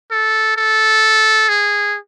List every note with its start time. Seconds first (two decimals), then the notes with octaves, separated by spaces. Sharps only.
0.11 A4
0.57 A4
1.49 G#4